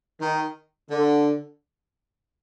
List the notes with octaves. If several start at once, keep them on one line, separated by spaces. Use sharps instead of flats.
D#3
D3